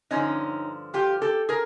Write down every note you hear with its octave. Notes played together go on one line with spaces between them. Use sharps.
G2 D3 F3 C#4 D#4
F4 G4
G4 A4
G#4 A#4